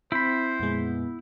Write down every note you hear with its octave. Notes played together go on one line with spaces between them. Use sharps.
C4 E4 C5 B5
F2 A#2 G#3 B3